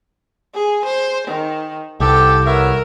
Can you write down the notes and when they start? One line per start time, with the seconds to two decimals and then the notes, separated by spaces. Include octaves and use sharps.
0.54 G#4
0.85 C5
1.27 D#3
2.00 C2 B3 C4 G4 A4
2.45 B3 A#4 C#5 E5